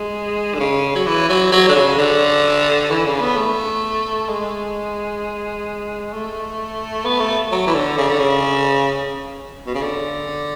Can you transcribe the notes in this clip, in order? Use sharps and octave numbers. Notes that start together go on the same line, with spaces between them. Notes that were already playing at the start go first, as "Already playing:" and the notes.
Already playing: G#3
D3
C#3
F#3
E3
F#3
F#3
D3
C#3
D3
E3
C#3
B3
A3
G#3
A3
B3
A3
F#3
E3
D3
C#3
D3
C#3
B2
C#3
D3